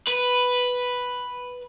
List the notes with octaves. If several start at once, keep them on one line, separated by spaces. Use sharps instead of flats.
B4